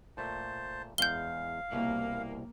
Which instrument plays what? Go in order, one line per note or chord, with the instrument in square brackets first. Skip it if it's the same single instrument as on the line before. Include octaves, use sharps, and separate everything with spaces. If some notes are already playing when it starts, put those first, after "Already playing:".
[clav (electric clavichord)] A#2 A3 [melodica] C5 A5
[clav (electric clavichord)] E2 G#3 [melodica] F5 [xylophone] G6 G7
[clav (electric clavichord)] C2 B2 E5 [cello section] A#3